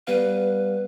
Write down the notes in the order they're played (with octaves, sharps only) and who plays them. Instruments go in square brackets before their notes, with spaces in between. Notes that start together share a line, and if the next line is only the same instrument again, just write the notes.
[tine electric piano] G3 B3 F5 [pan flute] B4